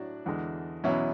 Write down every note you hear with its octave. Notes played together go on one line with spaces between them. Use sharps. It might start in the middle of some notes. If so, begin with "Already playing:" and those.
Already playing: A2 F#3 D4 F#4
E2 D3 G#3
E2 B2 F#3 C#4 E4